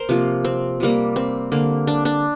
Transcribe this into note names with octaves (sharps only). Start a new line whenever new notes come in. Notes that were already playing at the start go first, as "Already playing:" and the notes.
Already playing: A#4 C5
C3 F3 A#3
C4
C3 G3 A#3
C4
D3 A#3
D4
D4